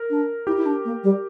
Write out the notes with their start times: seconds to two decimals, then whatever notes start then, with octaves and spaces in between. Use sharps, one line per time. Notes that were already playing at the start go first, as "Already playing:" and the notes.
Already playing: A#4
0.10 D4
0.47 E4 G4
0.57 E4
0.66 D4
0.85 A#3
1.04 G3